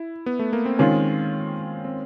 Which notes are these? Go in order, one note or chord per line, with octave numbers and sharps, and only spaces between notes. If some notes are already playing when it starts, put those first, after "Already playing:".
Already playing: E4
B3
A3
A#3
C4
D#3 G#3 C4 C#4 F4
C4